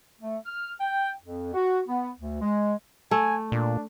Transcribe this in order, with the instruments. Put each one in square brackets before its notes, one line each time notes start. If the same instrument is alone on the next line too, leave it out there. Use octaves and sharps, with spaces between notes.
[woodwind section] A3
F6
G5
F2
F#4
B3
D2
G#3
[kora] A3 [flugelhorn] G#5
[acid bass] A#2 [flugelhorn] D4